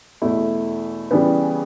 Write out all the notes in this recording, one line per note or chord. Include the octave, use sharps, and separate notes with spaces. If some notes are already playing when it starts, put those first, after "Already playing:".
E2 B2 A3 E4
C#3 E3 G3 B3